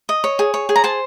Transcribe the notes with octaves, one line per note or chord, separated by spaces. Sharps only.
D#5
C#5
G#4
C#5
G#4
A#5
C5 A5